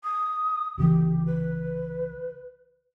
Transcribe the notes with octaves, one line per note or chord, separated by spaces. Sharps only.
D#6
C2 C#3 E3 G4
B4